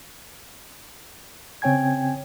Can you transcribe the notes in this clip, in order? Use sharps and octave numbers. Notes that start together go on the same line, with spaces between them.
C#3 C4 C#5 G5 G#5 G#6